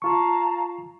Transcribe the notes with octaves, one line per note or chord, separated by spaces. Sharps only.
F4 F5 A5 A#5 C#6